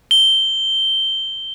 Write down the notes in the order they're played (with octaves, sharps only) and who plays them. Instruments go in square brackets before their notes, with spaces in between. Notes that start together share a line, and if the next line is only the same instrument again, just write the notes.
[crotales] G7